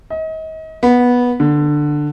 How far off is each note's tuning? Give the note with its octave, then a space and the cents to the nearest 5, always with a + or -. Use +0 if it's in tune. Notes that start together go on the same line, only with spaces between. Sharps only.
D#5 +35
B3 -10
D3 +10